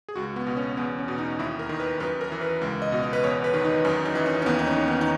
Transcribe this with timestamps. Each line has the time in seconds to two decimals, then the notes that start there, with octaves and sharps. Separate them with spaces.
0.09 G#4
0.16 C#2 F#4
0.36 B3
0.47 B2
0.57 C#4
0.77 E2 B3
0.99 C#4
1.08 B2
1.18 D#4
1.39 D#2 E4
1.59 A#4
1.69 D#3
1.80 B4
2.00 F#2 B4
2.21 A#4
2.32 E3
2.41 B4
2.61 C#2
2.82 D#5
2.92 B2
3.03 D#5
3.13 B4
3.23 E2 C#5
3.44 B4
3.54 D#3
3.64 D#4
3.84 F#2 C#4
4.05 D#4
4.15 E3
4.26 C#4
4.42 C#4
4.46 D#2 B3
4.59 D#4
4.67 C#4
4.76 D#3
4.88 B3
5.01 D#4